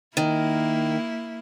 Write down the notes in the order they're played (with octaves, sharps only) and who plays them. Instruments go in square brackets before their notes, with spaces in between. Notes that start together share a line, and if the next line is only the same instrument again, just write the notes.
[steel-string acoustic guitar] D#3 [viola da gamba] A#3 E4